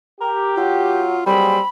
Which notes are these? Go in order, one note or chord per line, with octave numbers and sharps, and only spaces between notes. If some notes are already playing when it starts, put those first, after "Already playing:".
G4 A#4
F#3 F4
F#3 G3 A#3 C4 G#4 B5